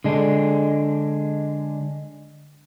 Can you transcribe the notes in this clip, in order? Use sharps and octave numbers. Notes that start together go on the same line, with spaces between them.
D3 G#3 D4